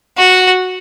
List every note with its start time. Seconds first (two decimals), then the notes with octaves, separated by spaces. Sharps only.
0.18 F#4